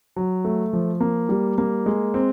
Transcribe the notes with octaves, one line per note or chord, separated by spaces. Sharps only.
F#3
A3
F3
A#3
G3
A#3
G#3
C4